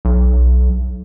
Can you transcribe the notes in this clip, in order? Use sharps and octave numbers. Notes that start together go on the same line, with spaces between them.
B1